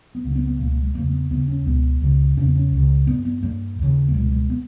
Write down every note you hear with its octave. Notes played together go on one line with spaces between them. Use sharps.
B3
C#2 C#3 A#3
C#4
B3
B3
C#2 B2 A#3
A#3
G#3
E2 C#3 A#3
A#3
B3
D#2 C#3 B3
C#4
C#2 B2 B3
C#2 C#3
E2 C#3 C#4
B3
C#4
C#2 C#3
G2 B3
B3
G2 A#3
D#2 C#3
A#3
C#2 B2 G#3
G#3
B3